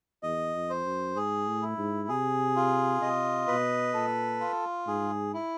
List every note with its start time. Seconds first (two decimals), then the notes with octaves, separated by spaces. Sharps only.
0.23 E2 D#5
0.54 F2
0.70 C5
0.85 F#2
1.16 G#2 G#4
1.47 A2
1.62 E4
1.78 G#2
2.09 C3 G#4
2.56 F4
3.01 C3 D#5
3.48 B2 B4
3.94 A#2 A4
4.40 F4
4.87 G#2 G#4
5.34 E4